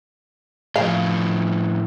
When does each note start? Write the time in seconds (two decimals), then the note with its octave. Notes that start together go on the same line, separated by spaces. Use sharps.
0.76 A2 F3 F5